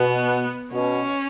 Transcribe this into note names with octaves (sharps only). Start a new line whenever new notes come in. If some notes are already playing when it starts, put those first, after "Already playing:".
Already playing: B2 B3
B2 C#4